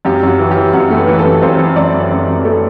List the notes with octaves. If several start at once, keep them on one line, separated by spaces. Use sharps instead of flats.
F#2 G4
F#2 F#4
E3
G4
E3
F#2 F#5
A3
B4
E3
B4
A4
F#2
F#2 C5
F#2
F#2 D5
F#2
F#2
F#2
A3 A4